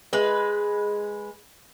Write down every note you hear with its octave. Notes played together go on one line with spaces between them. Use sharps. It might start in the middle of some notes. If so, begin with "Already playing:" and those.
G#3 B4